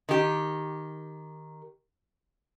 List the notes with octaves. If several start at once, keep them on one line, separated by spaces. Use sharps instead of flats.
D#3 G4